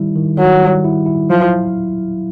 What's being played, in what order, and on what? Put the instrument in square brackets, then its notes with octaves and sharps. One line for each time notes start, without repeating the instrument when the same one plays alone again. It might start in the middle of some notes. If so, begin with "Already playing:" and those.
Already playing: [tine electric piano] D#3 G3 E4
D#3
[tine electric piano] D#3 [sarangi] F#3
[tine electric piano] G3
E4
E4
[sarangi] F3 [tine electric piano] F#3